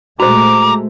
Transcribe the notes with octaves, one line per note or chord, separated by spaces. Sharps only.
A#2 G#3 A3 F#4 C5 A#5 D6